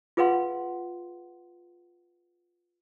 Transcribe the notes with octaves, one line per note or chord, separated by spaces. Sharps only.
F4 G#4 B4 F5 F#5 C6